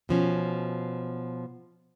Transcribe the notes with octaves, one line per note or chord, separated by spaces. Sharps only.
B2 F3 C#4